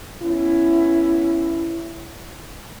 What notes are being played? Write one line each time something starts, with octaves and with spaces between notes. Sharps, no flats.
B3 C#4 E4